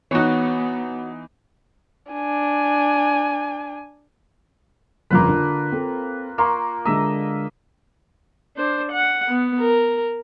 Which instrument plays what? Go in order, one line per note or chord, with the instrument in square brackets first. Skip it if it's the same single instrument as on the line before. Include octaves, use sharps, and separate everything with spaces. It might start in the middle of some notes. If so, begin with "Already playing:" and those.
[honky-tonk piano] E3 D#4 [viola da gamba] B3 [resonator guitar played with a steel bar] F#4 C#5
[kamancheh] D4 G#5
[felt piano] G1 F2 C#3 [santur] A#3 F4 B4
[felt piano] D3
C4 A4
[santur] A#3 [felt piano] A#5 C6 C#6
[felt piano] D3 G#3 A#5 [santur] D#5 E5
[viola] D4 C5
F#5
B3
A#4